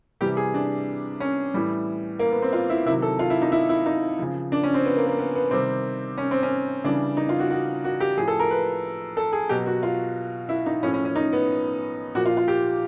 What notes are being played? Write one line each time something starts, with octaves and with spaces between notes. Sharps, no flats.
C3 E3 G3 G4
G#4
D4
C#4
A2 E3 G3
A#3
B3
C4
F4
E4
C3 D#3 F#3 E4
A4
F4
E4
D#4
E4
E4
D#4
C#3 F3
D4
C#4
C4
B3
A#3
A#3
B3
B3
C3 D#3 G3 C4
C#4
C4
C#4
C#3 E3 G3 D4
D#4
F4
F#4
F#4
F#4
G4
A2 F3 G#4
A4
A#4
B4
A4
G#4
B2 F#3 G4
F#4
F4
E4
D#4
A2 F3 C#4
C#4
C#4
D#4
B3
A#2 F3 F#4
F4
F4
G4